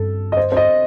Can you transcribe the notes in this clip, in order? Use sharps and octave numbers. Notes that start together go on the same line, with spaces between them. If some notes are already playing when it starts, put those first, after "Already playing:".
Already playing: G2 A4
D#5
C5
C5
D#5